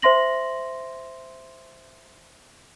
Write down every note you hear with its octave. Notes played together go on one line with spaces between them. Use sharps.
C5 E5 C6 A#6 F#7